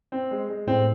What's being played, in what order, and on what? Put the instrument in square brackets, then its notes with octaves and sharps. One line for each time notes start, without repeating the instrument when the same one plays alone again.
[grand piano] C4
G#3
G#3
[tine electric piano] A2 [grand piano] C4